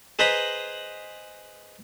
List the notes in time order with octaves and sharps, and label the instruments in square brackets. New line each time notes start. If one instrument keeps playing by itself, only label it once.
[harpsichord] G#4 B4 C5 D#5 A#5 B5